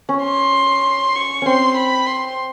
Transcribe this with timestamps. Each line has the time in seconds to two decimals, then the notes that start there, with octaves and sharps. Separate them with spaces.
0.09 C#4
0.24 C6
1.16 C#6
1.42 C4 C#4 C6
1.77 B5
2.07 C6